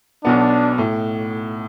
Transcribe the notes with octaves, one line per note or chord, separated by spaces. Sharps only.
B1 B2 B3 D4
A2